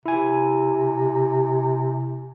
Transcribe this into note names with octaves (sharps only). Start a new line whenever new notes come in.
C3 E4 G#5